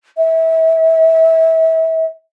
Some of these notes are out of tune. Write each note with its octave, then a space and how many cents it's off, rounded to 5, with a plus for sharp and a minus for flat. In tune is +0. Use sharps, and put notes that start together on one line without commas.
E5 -30